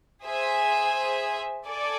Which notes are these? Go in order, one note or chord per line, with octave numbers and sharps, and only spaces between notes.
G#4 C5 E5 G#5
A4 D5 G#5